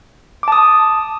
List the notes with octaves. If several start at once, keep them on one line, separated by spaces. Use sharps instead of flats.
A5 D6 D#6